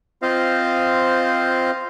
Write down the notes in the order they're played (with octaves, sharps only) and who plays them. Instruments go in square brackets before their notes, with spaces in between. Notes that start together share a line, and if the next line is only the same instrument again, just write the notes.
[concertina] C4 F4 C5 D#5 F5